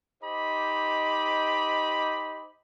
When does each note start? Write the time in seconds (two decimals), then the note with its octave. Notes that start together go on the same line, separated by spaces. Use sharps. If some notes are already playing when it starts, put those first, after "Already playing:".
0.23 D#4 G4 C5 D#5 B5 D6